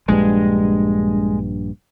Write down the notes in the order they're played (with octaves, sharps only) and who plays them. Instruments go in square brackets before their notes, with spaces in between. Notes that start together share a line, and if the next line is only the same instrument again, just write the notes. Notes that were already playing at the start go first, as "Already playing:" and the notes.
[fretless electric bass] A#1 G2 [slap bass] G#3